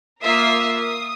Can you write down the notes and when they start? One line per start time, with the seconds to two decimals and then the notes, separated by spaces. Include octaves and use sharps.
0.23 A#3 F4 A#4 E5 D#6 C7
0.79 D#6